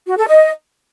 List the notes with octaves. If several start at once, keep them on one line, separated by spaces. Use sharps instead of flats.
F#4
A4
D#5